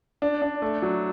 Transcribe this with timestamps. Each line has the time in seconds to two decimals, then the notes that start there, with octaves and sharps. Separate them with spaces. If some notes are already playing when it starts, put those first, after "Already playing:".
0.22 D4
0.42 D4
0.62 A3
0.82 F#3